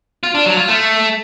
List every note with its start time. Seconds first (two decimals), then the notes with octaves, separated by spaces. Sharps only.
0.23 F4
0.35 D4
0.46 F#3
0.57 F4
0.68 A3